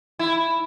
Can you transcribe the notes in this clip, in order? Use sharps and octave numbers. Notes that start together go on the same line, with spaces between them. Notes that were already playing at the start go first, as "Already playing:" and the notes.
E4